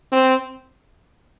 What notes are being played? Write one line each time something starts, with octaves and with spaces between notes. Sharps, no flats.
C4